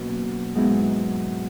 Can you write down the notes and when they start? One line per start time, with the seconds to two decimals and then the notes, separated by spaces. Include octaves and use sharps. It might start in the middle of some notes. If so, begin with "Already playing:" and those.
Already playing: B2 F#3 A#3 C#4
0.55 G#2 F#3 B3 E4